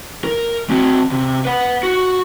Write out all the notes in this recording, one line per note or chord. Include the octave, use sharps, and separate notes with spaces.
A#4
C4 F#4
C3
B4 F#5
F#4